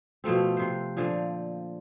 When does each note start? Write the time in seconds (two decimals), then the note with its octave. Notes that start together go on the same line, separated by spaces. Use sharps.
0.24 B2 F3 A3 C4
0.57 C3 C5
0.97 A#2 D3 F3